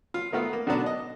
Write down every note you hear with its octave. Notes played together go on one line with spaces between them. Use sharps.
F4
D#3 A3 B3 F4
A#3
B2 D3 F#3 B3 D4
D#5